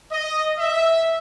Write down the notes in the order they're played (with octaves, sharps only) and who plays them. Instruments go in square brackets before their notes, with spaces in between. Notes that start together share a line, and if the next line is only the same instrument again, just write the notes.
[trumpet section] D#5
E5